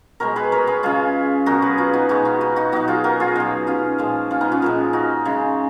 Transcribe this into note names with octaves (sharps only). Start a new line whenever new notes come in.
B2 G#3 A#4 C#5
G#4 B4
A#4 C#5
G#4 B4
C#3 G#3 F4 G#4
B2 F#3 F#4 A#4
G#4 B4
F4 G#4
D#4 F#4
B2 G#3 D#4 F#4
C#4 F4
D#4 F#4
D#4 F#4
B2 F#3 D#4 F#4
F4 G#4
F#4 A#4
F4 G#4
B2 F#3
C#4 F4
A#2 F3 G#3
C#4 F4
B3 D#4
C#4 F4
A#2 F3 G#3
D#4 F#4
C#3 G#3